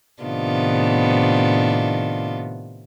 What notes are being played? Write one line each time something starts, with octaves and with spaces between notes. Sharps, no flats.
A2 C3 D#3 B3 D4 F4